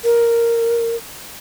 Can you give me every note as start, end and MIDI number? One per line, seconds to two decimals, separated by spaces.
0.04 0.96 70